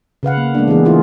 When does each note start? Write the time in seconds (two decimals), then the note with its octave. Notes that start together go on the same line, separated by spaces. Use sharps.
0.23 C#3 B4 F5 F#5
0.37 A#3
0.54 G#3 A#3 B3 D4
0.68 E3 A#3 B3 G#4
0.85 E3 A3 E4 F4 G#4